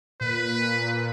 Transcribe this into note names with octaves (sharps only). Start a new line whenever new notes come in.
A#2 B4